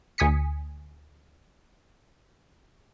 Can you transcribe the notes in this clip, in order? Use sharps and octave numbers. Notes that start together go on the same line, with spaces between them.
D2 G#5 D#6 B6 C#7